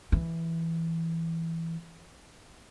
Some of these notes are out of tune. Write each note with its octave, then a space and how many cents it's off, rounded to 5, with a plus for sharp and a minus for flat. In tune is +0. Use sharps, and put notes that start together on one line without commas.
E3 +0